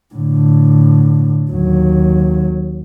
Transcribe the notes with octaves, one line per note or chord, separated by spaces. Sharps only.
A2 D3
D#2 F#3